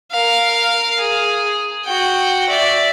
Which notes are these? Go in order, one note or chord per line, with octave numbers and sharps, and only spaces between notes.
A#4 F5
G#4
F#4 G5
D5 E5